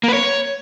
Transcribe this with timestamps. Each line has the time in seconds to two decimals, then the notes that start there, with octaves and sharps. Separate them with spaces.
0.03 A#3
0.08 B4
0.14 C#5